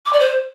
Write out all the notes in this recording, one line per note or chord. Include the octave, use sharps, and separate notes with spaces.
D6
D5
C5